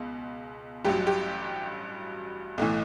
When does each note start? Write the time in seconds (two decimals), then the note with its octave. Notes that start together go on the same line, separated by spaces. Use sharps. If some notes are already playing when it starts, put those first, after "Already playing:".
Already playing: C#2 B2
0.85 A1 G2 F#3 G4
1.07 G4
2.58 B1 A2 E3